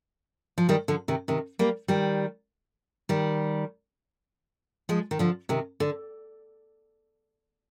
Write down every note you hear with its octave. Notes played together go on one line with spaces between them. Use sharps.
F3
D#3 G3
D3 F3
C3 D#3
C3 D#3
G3 A#3
D#3 G3
D#3 G3
F3 G#3
D#3
D3 F3
C3 D#3
D3